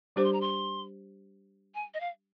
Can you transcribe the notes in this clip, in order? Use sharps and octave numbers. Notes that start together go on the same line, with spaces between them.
G3 D4 G4 C5 D6
C6
A#5
C6
G#5
D#5
F5